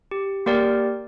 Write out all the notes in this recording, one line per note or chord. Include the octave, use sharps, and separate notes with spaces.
G4
A#3 G4 A#4 D5 G5